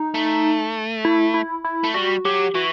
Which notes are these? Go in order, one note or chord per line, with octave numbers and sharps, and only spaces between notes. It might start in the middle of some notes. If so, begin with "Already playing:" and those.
Already playing: D#4
A3
E4
E4
E4
A3
G3 F#4
F#3 G4
E3 F#4